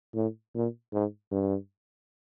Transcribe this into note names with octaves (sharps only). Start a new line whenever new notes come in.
A2
A#2
G#2
G2